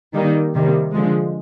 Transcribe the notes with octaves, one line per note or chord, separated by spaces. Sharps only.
D#3 G3 A#3 D#4
C3 D#3 G3 A#3
D3 F3 G#3